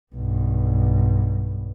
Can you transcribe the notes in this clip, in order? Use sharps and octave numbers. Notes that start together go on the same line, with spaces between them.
B1 G2